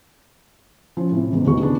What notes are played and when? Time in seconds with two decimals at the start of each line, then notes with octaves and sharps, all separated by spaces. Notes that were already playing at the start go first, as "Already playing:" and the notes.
0.97 F3 C#4
1.11 A2 C3
1.32 E2 G#2 C#3
1.47 E1 D#2 G#3 F#4 C#6
1.60 C#3 B3 D4